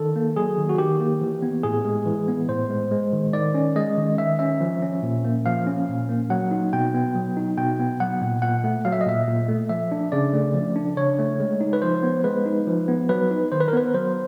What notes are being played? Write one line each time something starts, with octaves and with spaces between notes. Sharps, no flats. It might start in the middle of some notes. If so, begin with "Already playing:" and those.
Already playing: D#3 A4
A#3
F#3 G#4
D#3
F#4
D#3 G4
A#3
E3
B3
A2 G#4
G#3
E3
B3
A2 C5
G#3
G#3
D#3
D#3 D5
C#4
G#3 D#5
D#3
D#3 E5
C#4 E5
F3
C#4
A#2
A#3
F3 F5
C#4
A#2
A#3
F#3 F#5
D#4
B2 G5
B3
F#3
D#4
B2 G5
B3
F#3 F#5
A#2
A#2 F#5
A3
F#3 F5
E5
D#5
A#2 E5
A#2
A3
F3 E5
D4
C#3 D5
A3
F3
D4
C#3 C#5
A3
G#3
D#4
B4
F3 C5
B3
G#3 B4
D#4
F3
B3
F#3 B4
D#4
D#3 C5
B4
A#4
B3 B4
F#3 C5